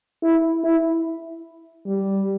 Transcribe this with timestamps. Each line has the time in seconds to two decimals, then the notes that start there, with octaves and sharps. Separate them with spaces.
0.23 E4
0.64 E4
1.86 G3